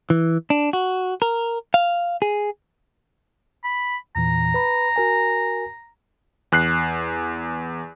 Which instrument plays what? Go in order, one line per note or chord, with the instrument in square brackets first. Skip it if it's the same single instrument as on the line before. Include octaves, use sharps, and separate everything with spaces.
[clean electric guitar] E3
D4
F#4
A#4
F5
G#4
[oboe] B5
[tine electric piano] E2 A#2 E3 [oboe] A#5
[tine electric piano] B4 B5
F#4 A#4 G#5
[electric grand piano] E2 F#6 C7